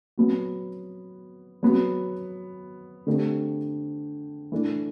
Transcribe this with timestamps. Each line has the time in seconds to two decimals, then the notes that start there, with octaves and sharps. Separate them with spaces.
0.18 F#3 B3 F#4
1.63 F#3 B3 F#4
3.07 D3 A3 C4 G4
4.52 E3 A3 D4